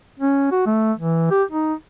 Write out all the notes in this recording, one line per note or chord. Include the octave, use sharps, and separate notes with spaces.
C#4
F#4
A3
E3
G4
D#4